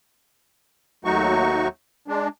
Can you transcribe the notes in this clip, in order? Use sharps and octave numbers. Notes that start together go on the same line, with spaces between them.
D#2 F#3 A3 D#4 F#4 C#6
G#3 D4